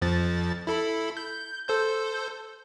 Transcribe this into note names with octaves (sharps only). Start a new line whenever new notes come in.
F2 F3 A6
E4 A4 B5
G6
A4 C5 G6